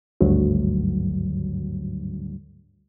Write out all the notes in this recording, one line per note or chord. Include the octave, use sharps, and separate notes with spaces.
G#1 D2 G2 F#3